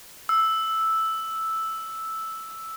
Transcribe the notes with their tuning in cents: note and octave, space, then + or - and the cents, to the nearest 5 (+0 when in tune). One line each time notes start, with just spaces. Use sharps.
E6 -5